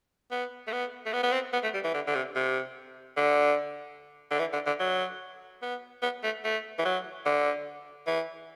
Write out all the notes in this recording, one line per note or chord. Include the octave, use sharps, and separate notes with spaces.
B3
A3
B3
A3
B3
B3
C4
B3
A3
G3
E3
D3
D3
C3
C3
D3
D3
E3
D3
D3
F#3
B3
B3
A3
A3
E3
F#3
D3
E3